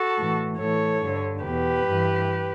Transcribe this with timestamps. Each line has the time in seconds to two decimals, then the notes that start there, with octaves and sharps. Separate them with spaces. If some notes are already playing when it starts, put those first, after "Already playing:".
Already playing: F#4 A4
0.17 A2 E3
0.59 A2 E3 A4 C#5
1.01 G2 D3
1.44 E2 B2 G4 B4
1.86 G2 E3